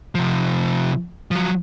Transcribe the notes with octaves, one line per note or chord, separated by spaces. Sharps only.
C3 F3
F3 F#3